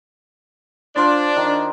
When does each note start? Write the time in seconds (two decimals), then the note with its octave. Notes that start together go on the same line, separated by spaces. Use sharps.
0.96 D4 F4 C5 D5
1.36 D#3